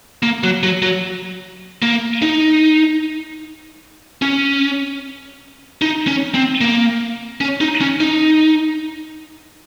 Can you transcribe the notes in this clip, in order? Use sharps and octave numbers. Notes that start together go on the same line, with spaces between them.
A#3
F#3
F#3
F#3
A#3
D#4
C#4
D#4
C#4
C4
A#3
C#4
D#4
C#4
D#4